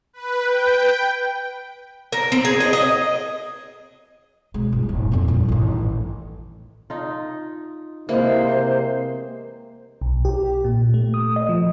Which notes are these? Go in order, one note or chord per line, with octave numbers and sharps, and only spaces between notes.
B4
G5
A#4
C4
G#4
D#5
D#5
B2 G#3
G1
D#1
F2 C4
G2 A#2
A1 D#3
D#4 F4
C3 E3 G#3 A#3 C5
B1
G4
A#2
A3
D#6
D#5
F3